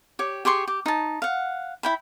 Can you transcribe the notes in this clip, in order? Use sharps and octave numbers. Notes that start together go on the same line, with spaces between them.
G4 C#5
G4 G#4 C6 C#6
G4
D#4 A5
F5 F#5
E4 G5 B5